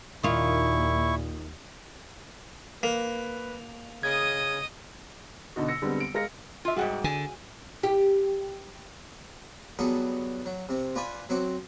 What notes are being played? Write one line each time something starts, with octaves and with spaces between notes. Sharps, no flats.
D#2 A#2 D#3 E4 F4 C#6
A#3 B4
C#3 D#5 D#6 G#6
B2 D3 D#4 F#4
E6 A#6 C#7
D3 G3 G#3 B3 C4
D7
G#3 A#4 F5 A#6 C#7
F4 E5
G#2 C3 G3 F#4 G#4 F#5
D3 G#5
G4
F#3 G3 B3 F#4 G#4 A4
F#3
C3 C4
F4 B4 D5 G#5 B5 D6
F#3 C4 F#4 D6